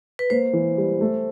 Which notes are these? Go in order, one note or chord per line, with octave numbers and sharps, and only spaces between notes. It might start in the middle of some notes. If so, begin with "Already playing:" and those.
B4
A#3 C5
E3
G3
A3